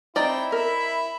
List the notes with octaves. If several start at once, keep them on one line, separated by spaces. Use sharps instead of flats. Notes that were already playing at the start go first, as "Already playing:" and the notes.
C4 D#4 E4 D5 G5
A#4 E5 B5